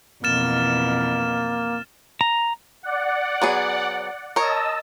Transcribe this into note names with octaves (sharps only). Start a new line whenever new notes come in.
F2 B2 E3 A#3 F6 A6 E7
A#5
D5 F#5
F#3 B3 G#4
A#4 C#5 D#5 A5 E6